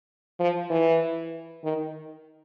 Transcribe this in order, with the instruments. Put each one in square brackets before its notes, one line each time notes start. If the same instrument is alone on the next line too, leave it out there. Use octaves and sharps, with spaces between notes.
[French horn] F3
E3
D#3